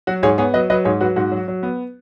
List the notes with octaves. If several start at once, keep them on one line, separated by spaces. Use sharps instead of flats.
F#3 F#4
G#2 G#4 C#5
B3 G#4 C#5
F#3 B4 D#5
F#3 B4 D#5
G#2 G#4 C#5
F#3 F#4 B4
G#2 F#4
F#3
F#3
B3